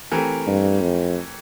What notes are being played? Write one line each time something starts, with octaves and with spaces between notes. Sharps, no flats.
E3 A3 C4 G4 A#4
G2
F2